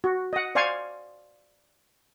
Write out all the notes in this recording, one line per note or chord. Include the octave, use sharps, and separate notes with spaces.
F#4
D#5 F#5
C5 D5 F5 G#5 C#6